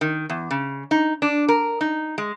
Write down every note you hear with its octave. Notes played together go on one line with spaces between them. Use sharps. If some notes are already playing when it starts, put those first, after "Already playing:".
D#3
E2
C#3
D#4
D4
A#4
D#4
G#3